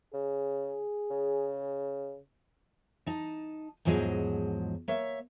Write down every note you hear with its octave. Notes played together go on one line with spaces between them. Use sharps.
C#3 G#4
C#3
D#4 A5
E2 G#2 F3 F#3 G#4 D#5
A#3 C#5 E5